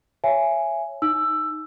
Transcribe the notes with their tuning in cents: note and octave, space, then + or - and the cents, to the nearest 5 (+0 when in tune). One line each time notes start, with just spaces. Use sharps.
C#5 +0 E5 +25 G#5 +0
D#4 +0 E6 +15